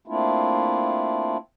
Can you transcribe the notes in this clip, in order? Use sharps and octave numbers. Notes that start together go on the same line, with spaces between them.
A3 A#3 C4 D4 E4 F4